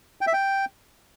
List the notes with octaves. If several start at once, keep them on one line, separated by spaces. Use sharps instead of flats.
G5
E5
G5